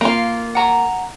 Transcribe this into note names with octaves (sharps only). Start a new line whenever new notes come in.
A#3 F4
F#5 A#5